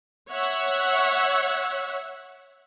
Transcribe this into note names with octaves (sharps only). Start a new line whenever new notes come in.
C#5 E5 F#5